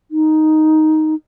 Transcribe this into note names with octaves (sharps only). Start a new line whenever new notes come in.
D#4